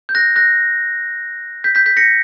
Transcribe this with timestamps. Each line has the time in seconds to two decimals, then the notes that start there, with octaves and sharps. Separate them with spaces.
0.09 G6
0.15 F#6 A#6
0.36 F#6 A#6
1.64 G6 B6
1.75 G6 B6
1.86 G6 B6
1.97 A#6 C#7